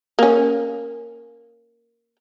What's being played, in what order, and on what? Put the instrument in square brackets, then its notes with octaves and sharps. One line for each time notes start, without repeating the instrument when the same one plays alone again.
[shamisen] A#3 C#4